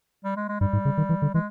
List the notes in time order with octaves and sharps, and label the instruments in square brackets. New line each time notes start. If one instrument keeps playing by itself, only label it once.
[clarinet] G3
G#3
G#3
[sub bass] G2 [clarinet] G3
[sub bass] G#2
C#3
D#3
E3
D3
[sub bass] E3 [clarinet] G#3